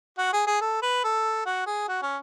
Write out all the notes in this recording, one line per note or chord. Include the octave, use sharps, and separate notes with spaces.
F#4
G#4
G#4
A4
B4
A4
F#4
G#4
F#4
C#4